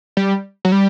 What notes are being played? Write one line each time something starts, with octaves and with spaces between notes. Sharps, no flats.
G3
F#3
G3